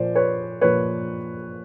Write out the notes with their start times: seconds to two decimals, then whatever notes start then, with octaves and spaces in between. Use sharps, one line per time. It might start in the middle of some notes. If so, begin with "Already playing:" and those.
Already playing: A#2 F3 A#3 C5 D5
0.15 B4 C#5
0.61 A#2 F3 A#3 B4 C#5